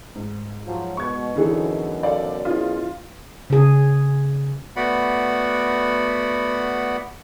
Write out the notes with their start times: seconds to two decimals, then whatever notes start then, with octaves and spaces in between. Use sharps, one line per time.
0.15 G#2
0.66 F3 F#3
0.97 B2 C#6 G#6
1.36 F#2 B2 D3 E3 D#4 E4 G#4 A4
2.03 A4 D5 F5
2.45 C#4 E4 F4 G#4
3.50 C#3 G#4
4.76 A3 B3 F#4 D5 F#5 B5